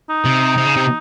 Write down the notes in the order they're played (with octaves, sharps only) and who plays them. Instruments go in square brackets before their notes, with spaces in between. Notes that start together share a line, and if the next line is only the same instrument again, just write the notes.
[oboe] D#4
[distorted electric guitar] C3
C3
C#3
C3